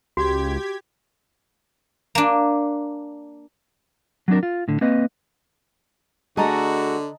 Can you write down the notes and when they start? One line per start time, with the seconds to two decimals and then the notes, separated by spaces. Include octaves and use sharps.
0.17 C#2 F#4 G4 G#6 B6
2.15 A#3 D4
4.28 F#3 G3 C4 D4 A#4
4.43 F4
4.68 A2 D3
4.81 A#3 C4 B4 D#5
6.37 D3 A3 F#4 G#4 D#5 A5 A#5